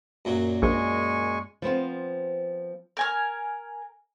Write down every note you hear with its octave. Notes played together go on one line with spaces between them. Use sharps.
F#2 A#2 F#3
A#1 G#3 G#5 C#6
F3 B3 C4 F4
A#4 G#5 F6